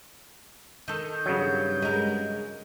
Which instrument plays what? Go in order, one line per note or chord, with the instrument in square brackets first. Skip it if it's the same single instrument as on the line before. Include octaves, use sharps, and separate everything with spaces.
[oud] D#3 A4 [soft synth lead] G6
[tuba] G2 [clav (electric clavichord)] C#3 F#3
[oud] G#3 A#4